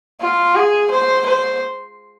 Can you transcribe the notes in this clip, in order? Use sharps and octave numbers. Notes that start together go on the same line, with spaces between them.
F4
G#4
C5
C5